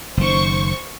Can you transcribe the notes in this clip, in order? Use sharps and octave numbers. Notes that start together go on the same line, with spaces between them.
F#1 D#3 C5 C#6